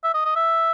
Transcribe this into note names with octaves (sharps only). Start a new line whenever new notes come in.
E5
D#5
D#5
E5